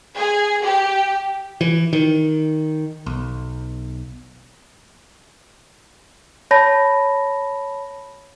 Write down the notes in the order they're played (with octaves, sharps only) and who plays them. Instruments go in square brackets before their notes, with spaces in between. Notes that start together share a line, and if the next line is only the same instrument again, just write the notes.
[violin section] G#4
G4
[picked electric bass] E3
D#3
B1
[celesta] C#5 A5 B5 A#6